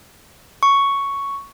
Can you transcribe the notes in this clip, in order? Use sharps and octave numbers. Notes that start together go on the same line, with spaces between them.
C#6